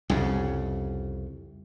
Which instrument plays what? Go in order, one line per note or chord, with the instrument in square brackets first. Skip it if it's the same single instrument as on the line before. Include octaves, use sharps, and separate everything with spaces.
[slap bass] C2 F2 C#3